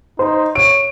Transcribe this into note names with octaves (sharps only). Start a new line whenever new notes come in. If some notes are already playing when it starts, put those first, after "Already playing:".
D#4 C5
C#5 D7